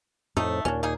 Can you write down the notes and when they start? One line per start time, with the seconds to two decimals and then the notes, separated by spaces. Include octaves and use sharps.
0.37 F2 A2 A3 D#4
0.65 D#2 A#2 C#4 D4
0.83 A#3 D#4 G#4